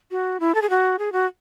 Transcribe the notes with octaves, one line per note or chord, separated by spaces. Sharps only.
F#4
E4
A4
G#4
F#4
G#4
F#4